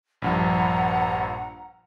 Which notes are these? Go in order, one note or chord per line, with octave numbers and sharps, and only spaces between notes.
A#1 G2 F3 F#5 A#5